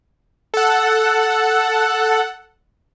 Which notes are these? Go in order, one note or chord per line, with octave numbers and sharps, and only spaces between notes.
A4 F#5